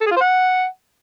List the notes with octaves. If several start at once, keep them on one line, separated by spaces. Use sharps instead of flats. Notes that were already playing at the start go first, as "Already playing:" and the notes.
A4
G#4
F4
C5
F#5